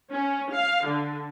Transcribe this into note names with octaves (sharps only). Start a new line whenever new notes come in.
C#4
F5
D3